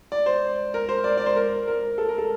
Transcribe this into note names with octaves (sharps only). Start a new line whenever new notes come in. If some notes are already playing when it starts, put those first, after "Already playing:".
D5
C5
A#4
C5
D5
D5
C5
A#4
A#4
A4
A#4
A4